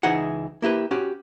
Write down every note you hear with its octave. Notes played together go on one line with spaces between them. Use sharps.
C#2 E3 D#4 E4 G#4 F#5
A#3 E4 G4 B4
C#4 F#4 G4